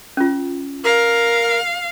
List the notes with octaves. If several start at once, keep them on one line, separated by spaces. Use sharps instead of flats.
C#4 F4
A#4 F5